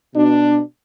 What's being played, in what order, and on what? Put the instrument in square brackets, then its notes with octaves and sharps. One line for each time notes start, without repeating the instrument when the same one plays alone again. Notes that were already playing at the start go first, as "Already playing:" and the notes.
[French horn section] B2 D4